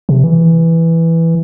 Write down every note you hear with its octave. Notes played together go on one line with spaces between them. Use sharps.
C3
E3